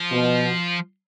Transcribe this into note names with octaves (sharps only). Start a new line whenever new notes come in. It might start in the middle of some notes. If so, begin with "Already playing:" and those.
Already playing: F3
B2